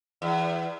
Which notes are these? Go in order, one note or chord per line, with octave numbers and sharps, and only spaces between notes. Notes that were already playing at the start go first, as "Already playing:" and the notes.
E2